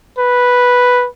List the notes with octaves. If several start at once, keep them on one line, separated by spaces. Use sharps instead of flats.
B4